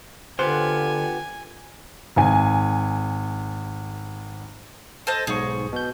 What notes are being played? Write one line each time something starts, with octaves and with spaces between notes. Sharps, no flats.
D3 B3 F4 G4 C5 F#5 G#5
G#1 G#5
A4 C5 D#5
B1 G#2 G#4 C#6
B2 G6